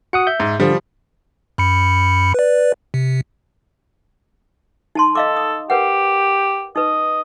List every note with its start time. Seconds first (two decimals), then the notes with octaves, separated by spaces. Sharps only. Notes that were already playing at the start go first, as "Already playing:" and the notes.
0.13 F#4 F#5 D#6 C#7
0.27 E5 G6
0.40 G#2
0.60 D3 F3 G3
1.58 F#2 B5 C#7
2.34 B4 D5
2.94 C3
4.95 D#4 A5 C6
5.15 A4 D#5 F5 D6
5.37 D#6
5.70 G4 A#4 B4 F#5
6.76 D#4 B4 D#5